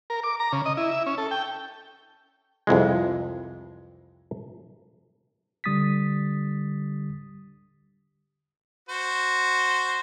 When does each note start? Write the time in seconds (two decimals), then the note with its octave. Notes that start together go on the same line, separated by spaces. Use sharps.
0.10 A#4
0.24 D6
0.40 A#5
0.52 C#3
0.66 D#5
0.77 E4
0.91 E5
1.06 C#4
1.18 A4
1.31 G5
2.67 C2 F2 E3 G#3
5.64 D3 G3 D#6 A6 B6
8.89 F#4 C5